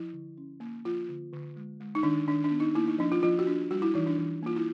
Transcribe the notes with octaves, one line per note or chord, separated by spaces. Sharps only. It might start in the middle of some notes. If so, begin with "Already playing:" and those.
Already playing: F3 E4
D3
C#4
A#3
F3 F4
D3
D3
G#3
G#3
D#4
D#3 D4
D#3 D4
D4
B3
D#4
A#3 E4
D#4
F3 D4
F4
F3 F4
F#4
D4
G3 F#4
E4
E3 D#4
D4
E3
A#3 F4
E4